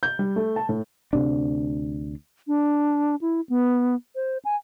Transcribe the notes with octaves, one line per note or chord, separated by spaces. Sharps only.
G6
G3
A3
A5
A2
D2 C3 D4
D4
E4
B3
C5
G#5